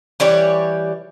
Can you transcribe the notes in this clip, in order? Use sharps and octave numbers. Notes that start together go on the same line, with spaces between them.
E3 G3 G4 C#5